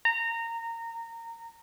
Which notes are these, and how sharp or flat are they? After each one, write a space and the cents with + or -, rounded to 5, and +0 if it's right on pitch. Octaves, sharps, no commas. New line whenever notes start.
A#5 -20